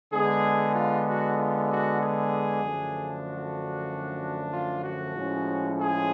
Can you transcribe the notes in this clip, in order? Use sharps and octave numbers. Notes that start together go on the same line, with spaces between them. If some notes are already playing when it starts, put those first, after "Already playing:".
D3 G#3 B3 G#4
F4
F#4
F4
F#4
G#4
F#2 D3 F3 A3 D4
F#4
F4
F#4
A2 F3 G#3 C#4
G#4